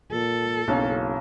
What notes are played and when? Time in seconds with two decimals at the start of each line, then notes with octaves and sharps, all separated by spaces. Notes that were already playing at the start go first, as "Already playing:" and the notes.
0.12 A#2 A4
0.68 F#1 B1 C#4 F5